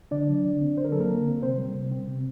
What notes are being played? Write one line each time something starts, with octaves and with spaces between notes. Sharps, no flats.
D3 D4 D5
F#3
D3
C4
D3 C5
A#4
F#3 A4
A#3 A#4
D3
C4
C3 C4 C5
G3
C3
C4
C3